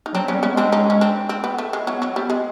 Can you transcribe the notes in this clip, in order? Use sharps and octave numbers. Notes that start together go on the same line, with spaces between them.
D#4
F#3 C4 D4
B3 C#4
G3
B3 C#4
G#3 C4 D4
C#4 D#4
C#4
C4 D4
C4
B3
A3
G#3
F#3 B3
F#3
G3 B3
G#3